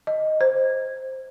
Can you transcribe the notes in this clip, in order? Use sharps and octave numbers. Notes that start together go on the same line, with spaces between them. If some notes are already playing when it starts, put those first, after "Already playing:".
D#5
C5